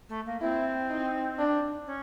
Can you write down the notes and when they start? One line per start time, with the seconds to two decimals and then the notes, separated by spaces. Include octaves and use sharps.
0.09 A3
0.26 A#3
0.41 C4 E4
0.90 D#4
1.38 D4
1.86 C#4